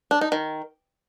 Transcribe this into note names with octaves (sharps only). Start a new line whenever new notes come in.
D4
D#4
D#3